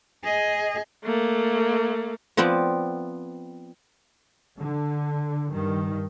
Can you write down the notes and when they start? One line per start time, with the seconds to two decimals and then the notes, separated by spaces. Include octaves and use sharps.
0.23 G#4 D#5
1.05 A3 A#3
2.37 F3 B3 C4 F4 D5
4.58 D3
5.52 G2 D#3